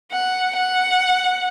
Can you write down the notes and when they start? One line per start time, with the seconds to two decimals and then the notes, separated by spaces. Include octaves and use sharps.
0.12 F#5
0.55 F#5